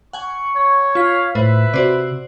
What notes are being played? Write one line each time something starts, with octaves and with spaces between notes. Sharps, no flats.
F#5 G#5 C#6
C#5
F4 F5 B6
A2 B4 C5 E5
C3 F#4 C5 D5